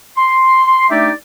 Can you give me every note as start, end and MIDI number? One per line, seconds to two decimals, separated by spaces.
0.18 0.87 84
0.90 1.10 57
0.90 1.10 62
0.90 1.10 63
0.90 1.10 67
0.90 1.10 74
0.90 1.10 76